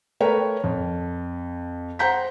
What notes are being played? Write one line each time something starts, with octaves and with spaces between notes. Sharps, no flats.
A3 A#4 B4 C#5 G5
F2
C5 F#5 A#5 G6 B6